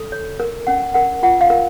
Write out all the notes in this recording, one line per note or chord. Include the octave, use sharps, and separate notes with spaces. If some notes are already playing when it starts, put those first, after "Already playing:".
Already playing: A4
C#5
A#4
C#4 F#5
A#4 F#5
F4 F#5
F5
A#4